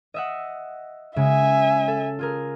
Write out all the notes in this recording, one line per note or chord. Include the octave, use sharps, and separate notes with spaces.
D#5 E5 F#5
C#3 G#3 F#4 E5 G#5
A4
F4 G#4 A#4